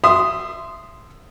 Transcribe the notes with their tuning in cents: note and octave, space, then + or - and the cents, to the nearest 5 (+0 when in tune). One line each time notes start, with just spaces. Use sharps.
E5 +20 C6 -10 D#6 +0